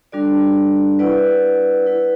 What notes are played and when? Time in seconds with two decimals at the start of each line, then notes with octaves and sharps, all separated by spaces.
0.12 G3 D4 F#4 A4 D5
0.99 E4 B4 D5 F#5
1.86 E4 B4 F#5